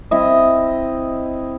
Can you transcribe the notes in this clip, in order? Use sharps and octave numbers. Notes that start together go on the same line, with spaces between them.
C4 E4 D#5